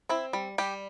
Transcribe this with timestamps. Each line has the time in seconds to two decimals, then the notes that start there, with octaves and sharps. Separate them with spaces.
0.09 C4 E4
0.33 G3
0.58 G3 G4